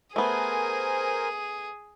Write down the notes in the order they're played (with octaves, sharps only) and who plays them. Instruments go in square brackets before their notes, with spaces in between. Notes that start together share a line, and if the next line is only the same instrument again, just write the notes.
[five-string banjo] A3 B3 [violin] G#4 [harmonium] A#4 C5 G#5